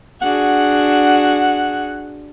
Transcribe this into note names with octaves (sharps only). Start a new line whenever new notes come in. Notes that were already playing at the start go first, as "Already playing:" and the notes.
D4 F#4 G#4 F#5